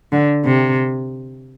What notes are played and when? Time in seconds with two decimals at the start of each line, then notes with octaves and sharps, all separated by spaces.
0.12 D3
0.45 C3